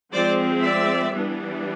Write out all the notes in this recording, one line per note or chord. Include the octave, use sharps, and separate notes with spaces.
F3 G#3 C4 C5 D5
D5 E5
E3 G3 B3 D4